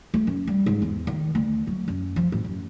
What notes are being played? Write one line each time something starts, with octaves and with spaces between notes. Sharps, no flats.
A3
F#2
G3
G#2
E2
D#3
D2
F#3
F#2
F3
A1
F#2